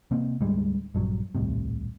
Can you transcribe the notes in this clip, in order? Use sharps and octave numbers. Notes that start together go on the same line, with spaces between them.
C3 A#3 C4
D2 G#2 G3 G#3
A#1 G2 F#3
D#1 C2 A2 C3